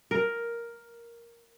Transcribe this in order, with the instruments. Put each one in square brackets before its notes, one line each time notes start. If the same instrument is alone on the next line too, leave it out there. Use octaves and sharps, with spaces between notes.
[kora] A#4